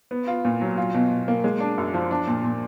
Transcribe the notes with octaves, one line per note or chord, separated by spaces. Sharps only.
B3
F4
A#2
F#3
F4
B2
B2
A#3
G#3
D4
F#2
F3
D4
A#2
A#2